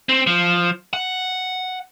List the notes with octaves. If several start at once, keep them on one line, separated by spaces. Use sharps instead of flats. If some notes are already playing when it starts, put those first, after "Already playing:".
C4
F3
F#5